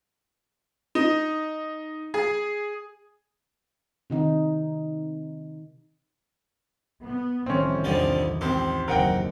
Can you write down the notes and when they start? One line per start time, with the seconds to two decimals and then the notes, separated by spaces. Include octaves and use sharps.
0.95 D#4
2.14 G#4
4.10 C3 D#3 D#4
7.03 B3
7.46 C2 A2 D#3 F3 C4 C#4
7.84 E2 D3 F3 G3 D#4 D6
8.41 C#2 C4 G4 C5
8.88 F#1 D#2 C3 C4 A#4 F#5 G5 A#6